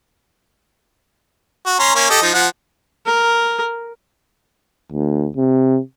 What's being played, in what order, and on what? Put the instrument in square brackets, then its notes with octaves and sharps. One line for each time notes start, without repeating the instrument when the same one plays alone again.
[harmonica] F#4
C#4 A#5 C6
A#3 C#4
G4 A4 D#5
F3 D#4
F3 F#5
[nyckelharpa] A#4
[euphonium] D2
C3